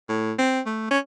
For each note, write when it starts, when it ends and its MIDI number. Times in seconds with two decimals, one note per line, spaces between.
0.09 0.33 45
0.39 0.61 60
0.66 0.87 57
0.91 0.99 61